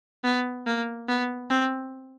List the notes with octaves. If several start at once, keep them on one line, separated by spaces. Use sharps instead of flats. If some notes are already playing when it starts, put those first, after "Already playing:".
B3
A#3
B3
C4